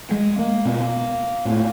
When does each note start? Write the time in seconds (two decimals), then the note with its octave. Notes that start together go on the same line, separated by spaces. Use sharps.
0.11 G#3
0.39 A#3
0.65 B2
1.45 A2